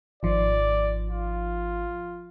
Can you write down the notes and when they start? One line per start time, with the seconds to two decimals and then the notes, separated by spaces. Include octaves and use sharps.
0.23 G#1 F3 D5
1.10 F4